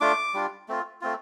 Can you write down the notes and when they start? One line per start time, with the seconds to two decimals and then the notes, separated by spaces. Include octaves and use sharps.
0.01 A3 D4 F4 D6
0.34 G3 D4 F4
0.68 A3 C4 F4
1.01 A3 C4 F4